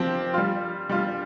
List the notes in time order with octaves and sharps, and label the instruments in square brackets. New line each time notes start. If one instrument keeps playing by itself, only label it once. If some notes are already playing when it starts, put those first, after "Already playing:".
Already playing: [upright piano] F3 C4 G4
G3 F4
G3 F4